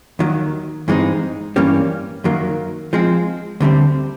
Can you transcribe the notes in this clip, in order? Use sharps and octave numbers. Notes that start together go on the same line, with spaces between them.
D#2 D#3 F#3
G2 E3 G#3 C4 D#4
G2 E3 G3 A#3 C#4
F#2 D#3 F#3 A#3
F3 G#3 C4
D2 D3 G3 C4